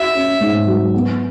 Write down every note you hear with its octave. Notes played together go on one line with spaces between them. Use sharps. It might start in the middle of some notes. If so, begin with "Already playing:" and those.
Already playing: F#4 E5
C#4
G#2
F#3
B3